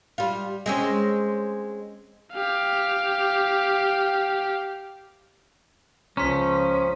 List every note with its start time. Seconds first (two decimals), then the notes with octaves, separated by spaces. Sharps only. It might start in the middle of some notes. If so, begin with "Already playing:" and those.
0.18 G3 F4
0.66 G#3 C4 C#4
2.33 G4 F5
6.17 C#2 F3 C#4 A#5 C6 B6